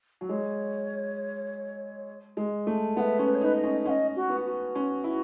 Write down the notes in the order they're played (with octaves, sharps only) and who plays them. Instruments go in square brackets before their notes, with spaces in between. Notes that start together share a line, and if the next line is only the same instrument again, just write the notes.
[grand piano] F#3
[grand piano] G#3 [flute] C#5
[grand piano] G#3
A3
[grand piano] B3 [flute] F#5
[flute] E5
[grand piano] C#4
[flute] B4
C#5
[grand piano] D#4 [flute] B4
[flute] D#5
[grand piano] C#4
[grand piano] C#4 [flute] F#5
[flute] D#5
F#4
[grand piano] B3
[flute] F#4
[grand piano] C#4
E4